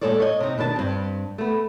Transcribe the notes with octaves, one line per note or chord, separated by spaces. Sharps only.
A#2 G#3 G#4 A4 C#5 D5
C#5 D#5
C3 D#4
B2 D#3 D4 A5
G2 C4
A3 B3